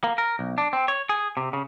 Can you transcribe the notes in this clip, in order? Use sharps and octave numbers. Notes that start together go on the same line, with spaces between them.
A#3
A#4
B1
D4
C4
C#5
G#4
C3
C#3